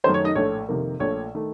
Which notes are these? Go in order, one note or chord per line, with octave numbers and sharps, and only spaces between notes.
F#2 D#3 A3 C5
C#5
D#4 D#5
A#1 A2 A3 C#5
F2 C3 D#3 A#3
A#1 A#2 A3 C#5
D#3 A3